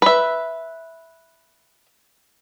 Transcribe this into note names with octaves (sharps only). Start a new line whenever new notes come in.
B4 E5